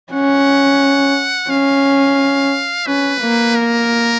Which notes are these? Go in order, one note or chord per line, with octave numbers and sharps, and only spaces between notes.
C#4 F#5
C#4 F5
C#4 B4
A#3
A#4